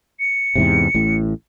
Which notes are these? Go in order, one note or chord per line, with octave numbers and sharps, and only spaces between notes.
C#7
E2 G#2 C3
A1 A2